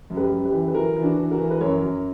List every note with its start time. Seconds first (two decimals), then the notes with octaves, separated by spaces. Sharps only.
0.10 F#2
0.17 G4 B4
0.31 F#2
0.45 G4 B4
0.52 E3
0.67 B4
0.74 E3 F#4 A#4
0.96 E3
1.02 D4 F#4
1.17 E3
1.31 F#4 A#4
1.38 E3
1.50 B4
1.60 F#2 A#4 C#5
1.82 F#2